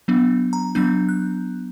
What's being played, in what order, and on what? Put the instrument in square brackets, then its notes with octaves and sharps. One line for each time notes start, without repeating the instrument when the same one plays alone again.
[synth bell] F#3 B3 D4
A#5
F#3 B3 D4 G6
F#6